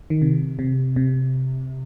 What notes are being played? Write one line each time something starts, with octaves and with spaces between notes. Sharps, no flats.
D#3
C3
C3
C3